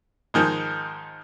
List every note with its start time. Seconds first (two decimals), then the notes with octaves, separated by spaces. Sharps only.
0.34 G#2 D#3 F3 G#3